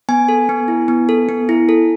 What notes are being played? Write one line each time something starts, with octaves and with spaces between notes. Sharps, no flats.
B3 G#5
A4
B3
E4
B3
A4
B3
E4
A4